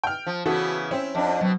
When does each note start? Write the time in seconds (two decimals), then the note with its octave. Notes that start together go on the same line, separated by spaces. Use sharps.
0.04 G5 F6
0.27 F3
0.46 C#3 E3 B3 F#4 A4
0.91 C4 C#4 E4 C5 E5
1.15 F2 D4
1.41 B2 F#3 C4